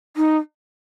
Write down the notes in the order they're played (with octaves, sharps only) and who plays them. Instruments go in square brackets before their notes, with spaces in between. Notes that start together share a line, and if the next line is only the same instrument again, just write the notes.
[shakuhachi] D#4